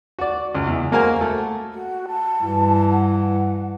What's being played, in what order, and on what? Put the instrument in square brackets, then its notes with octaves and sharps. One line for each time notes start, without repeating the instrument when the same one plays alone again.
[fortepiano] F#4 D5
C#2
E2
G#3 A#3 F#4 A#4 C5 G#5
A3
[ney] F#4
A5
[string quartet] G2 E3
[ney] F#5